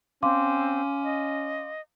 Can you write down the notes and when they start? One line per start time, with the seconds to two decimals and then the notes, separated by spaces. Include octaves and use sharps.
0.23 C4 C#4 F5 C6 D6
1.04 D#5